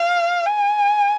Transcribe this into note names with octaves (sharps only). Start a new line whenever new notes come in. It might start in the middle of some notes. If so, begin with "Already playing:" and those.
Already playing: F5
G#5